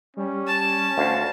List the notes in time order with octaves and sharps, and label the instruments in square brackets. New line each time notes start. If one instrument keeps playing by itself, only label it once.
[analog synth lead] G3 [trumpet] C#4
[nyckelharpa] A5
[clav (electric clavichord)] D2 [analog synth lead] F5